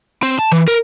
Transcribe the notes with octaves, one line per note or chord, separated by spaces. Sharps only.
C4
A5
E3
A#4